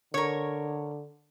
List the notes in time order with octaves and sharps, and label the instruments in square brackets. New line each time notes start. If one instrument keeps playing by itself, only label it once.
[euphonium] D3 [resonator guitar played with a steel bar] A#4 C#5